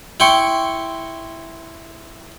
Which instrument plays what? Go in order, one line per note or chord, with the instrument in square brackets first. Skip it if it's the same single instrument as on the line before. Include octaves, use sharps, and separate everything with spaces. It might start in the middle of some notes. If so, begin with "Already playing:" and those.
[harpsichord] E4 G5 C6 C#6